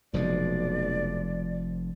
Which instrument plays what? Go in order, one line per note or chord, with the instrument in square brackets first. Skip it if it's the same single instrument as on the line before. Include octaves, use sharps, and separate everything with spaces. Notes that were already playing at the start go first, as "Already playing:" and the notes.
[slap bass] F1 F3 G#3 [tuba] B1 [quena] D5